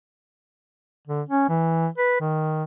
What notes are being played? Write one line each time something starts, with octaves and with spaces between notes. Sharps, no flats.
D3
C#4
E3
B4
D#3